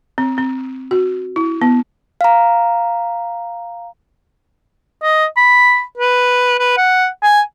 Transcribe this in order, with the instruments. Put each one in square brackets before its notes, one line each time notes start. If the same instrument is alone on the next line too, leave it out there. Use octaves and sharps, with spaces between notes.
[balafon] C4
C4
F#4
E4
B3
[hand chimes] F5 A#5
[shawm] D#5
B5
B4
B4
F#5
G#5